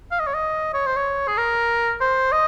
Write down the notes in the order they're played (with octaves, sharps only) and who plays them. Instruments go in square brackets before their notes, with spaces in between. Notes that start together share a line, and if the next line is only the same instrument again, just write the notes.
[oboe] F5
D#5
C#5
D#5
C#5
C5
C#5
G#4
A#4
C5
D#5